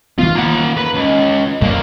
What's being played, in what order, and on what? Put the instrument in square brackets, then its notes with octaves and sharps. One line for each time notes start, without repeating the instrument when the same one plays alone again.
[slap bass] D#3 E3 B3 [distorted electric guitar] F4
[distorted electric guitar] A#3 F#5
B4
C#2
[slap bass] F#2 [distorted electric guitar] D3 A#3